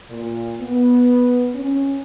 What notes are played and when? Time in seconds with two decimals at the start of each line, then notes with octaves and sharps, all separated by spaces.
0.10 A#2
0.61 B3
1.54 C#4